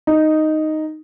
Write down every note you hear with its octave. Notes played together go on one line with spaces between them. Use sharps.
D#4